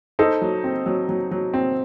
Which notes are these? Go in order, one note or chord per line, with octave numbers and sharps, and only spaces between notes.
D#4 A4 C5
F#3
C4
F#3
F#3
F#3
C4